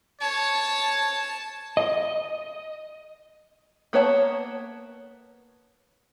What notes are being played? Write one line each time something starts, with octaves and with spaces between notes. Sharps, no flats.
C#5 A5
D#5
A#3 B3 C#5 A5